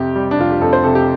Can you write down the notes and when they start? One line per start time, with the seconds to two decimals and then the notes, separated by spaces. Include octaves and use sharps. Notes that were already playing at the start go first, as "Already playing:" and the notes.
Already playing: F2 C3 G4
0.16 G3
0.31 D4
0.38 F1 F4
0.52 G4
0.61 F2 A4
0.73 C5
0.83 C3 A4
0.95 G4